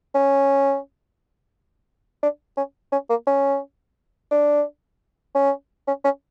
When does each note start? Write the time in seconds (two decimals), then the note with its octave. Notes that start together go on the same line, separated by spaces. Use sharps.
0.15 C#4
2.23 D4
2.57 C#4
2.92 C#4
3.10 A#3
3.27 C#4
4.31 D4
5.35 C#4
5.87 C#4
6.04 C#4